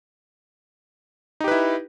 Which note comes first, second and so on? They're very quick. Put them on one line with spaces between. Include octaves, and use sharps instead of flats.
D#4 G4 B4 E4